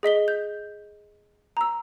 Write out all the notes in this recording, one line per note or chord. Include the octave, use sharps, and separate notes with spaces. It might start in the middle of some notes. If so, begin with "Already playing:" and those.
G#4 D#5 B6 G7
G6
A#5 E6